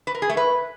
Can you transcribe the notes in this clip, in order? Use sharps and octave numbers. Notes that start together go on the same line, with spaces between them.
B4
A#4
G#4
A3
B4